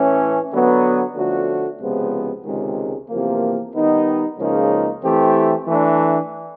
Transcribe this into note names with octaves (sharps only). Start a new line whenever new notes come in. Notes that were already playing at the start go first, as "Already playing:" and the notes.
Already playing: A2 E3 A3 C#4
D3 F#3 B3
D3 F3 A3 C#4 F#4
C#2 C3 F3 G#3 B3
C#2 C3 D#3 G#3
E2 C3 F3 A#3
D#3 G3 B3 D#4
C#2 C#3 F3 A#3 D#4
E3 A3 C4 E4 G4
E3 A3 D4